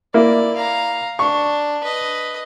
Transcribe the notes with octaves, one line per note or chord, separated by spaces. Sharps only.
A#3 E4 D5
F5 A#5
D4 C#6
B4 D#5